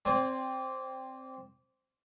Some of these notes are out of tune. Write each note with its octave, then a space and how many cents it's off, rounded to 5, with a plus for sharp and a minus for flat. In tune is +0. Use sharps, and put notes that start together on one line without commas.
C4 +0 D5 -20 G#5 -25